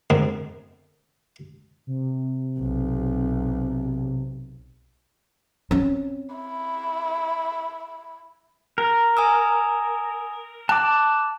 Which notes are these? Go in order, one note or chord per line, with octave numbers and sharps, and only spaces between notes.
G#2 B2 D3 A#3 C4 G#4
C3
B1
C4 C#4
E4
A#4
G#5 D#6 E6
A5 D6 F#6